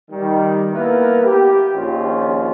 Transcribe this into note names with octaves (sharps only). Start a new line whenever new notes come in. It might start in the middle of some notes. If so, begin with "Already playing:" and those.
D#3 G3
A#3 B3 E4 A#4 B4
G4
A#1 D#2 C#4 F4